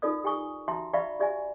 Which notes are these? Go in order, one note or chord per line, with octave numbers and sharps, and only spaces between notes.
D#4 F4 A4 A#4 D5 D#6
G4 G5 G#5 C#6 D#6
F#4 E5 G5 A5 A#5 C6
D5 E5 F5 G5 B5 C#6
F#4 G4 D5 E5 G#5